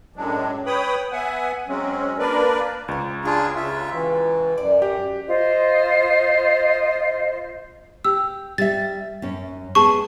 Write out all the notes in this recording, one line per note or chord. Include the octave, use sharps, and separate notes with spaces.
F#2 A2 F#3 G#3 D4
B4 C#5 G5 B5 D#6
B3 E5 F#5 G#5
F#3 G#3 C4 C#4
A#3 D4 A#4 B4 D5
C#2 C5 C#5
F#3 G#3 D4 F4 G4 G#4
C#3 F4 E5
E3
F#2 D5
G4 F#5
F4 C5 D#5
G4 E6
G3 E5 A6
F#2 C#4
G#3 B3 G#4 A5 C#6